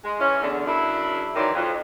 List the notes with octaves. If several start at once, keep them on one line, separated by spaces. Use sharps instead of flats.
G#3
E3 C#4
E2 D3
F#2 C#3 D4 E4
D#3 E3 F#3 C5 D5
F2